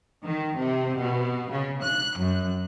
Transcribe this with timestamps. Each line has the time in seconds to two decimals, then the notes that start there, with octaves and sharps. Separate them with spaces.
0.23 D#3
0.57 C3
0.97 B2
1.50 C#3
1.81 F#6
2.17 F#2